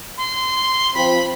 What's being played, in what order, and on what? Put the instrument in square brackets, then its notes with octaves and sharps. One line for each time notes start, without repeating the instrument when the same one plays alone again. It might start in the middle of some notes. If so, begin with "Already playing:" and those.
[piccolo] C6
[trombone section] F3 C4 [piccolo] B5